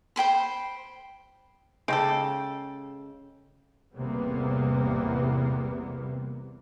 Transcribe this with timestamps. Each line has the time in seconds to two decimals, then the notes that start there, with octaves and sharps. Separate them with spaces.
0.16 C5 G5 B5 C6
1.88 C#3 G#3 G4 A4 G5 G6 D7
3.96 A1 E2 C3 G3 A#3 B3